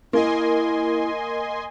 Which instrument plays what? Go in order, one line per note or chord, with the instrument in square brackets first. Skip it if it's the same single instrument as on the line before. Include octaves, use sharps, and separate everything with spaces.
[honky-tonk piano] A#3 [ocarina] E4 [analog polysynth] D#5 G#5 C6